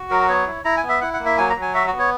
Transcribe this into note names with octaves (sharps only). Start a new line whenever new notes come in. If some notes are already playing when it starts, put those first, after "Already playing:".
Already playing: F#4
F#3 A#4
B3 C#5
E4
E4 A#5
G#5
B3
E5
E4 F#5
F#5
A#3
E5
F#3 G#5
A#5
F#3
G#5
F#4 E5
F#4
B3
C#5